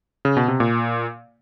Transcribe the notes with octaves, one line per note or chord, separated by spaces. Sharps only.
C#3
B2
C3
A#2